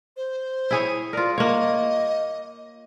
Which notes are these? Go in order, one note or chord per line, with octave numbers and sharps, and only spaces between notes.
C5
E4 G#4 C#5
F4 A#4 D5
A#3 C#5 D#5